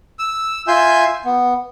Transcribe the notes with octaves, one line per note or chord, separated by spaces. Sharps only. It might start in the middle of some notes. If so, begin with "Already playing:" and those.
E6
F4 E5 G#5 C6 G6
B3